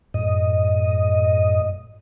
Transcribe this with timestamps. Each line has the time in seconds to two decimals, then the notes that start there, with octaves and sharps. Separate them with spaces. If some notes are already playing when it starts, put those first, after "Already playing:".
0.14 F#2 A2 D#5